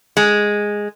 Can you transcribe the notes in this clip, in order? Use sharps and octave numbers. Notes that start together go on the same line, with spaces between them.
G#3